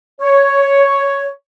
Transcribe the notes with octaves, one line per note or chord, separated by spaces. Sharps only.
C#5